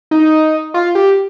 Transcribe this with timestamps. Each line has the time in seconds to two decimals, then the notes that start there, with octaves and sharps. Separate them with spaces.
0.11 D#4
0.74 F4
0.95 G4